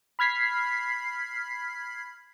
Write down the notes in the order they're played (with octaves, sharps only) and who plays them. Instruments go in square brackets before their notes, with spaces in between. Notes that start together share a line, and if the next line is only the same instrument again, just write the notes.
[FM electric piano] B5 F6 G#6 B6 C7